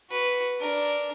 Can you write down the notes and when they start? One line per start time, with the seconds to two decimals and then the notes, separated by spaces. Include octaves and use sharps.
0.10 F#4 B4
0.60 D4 A#4